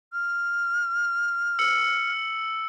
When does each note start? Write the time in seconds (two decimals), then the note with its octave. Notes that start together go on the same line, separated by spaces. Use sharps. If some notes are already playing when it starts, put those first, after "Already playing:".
0.13 F6
1.59 E6 C#7 F#7